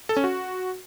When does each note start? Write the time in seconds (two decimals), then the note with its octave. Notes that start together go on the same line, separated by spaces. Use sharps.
0.09 A4
0.17 C#4
0.24 F#4